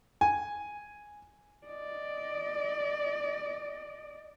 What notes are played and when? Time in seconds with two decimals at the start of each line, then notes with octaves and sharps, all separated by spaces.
0.21 G#5
1.66 D5 D#5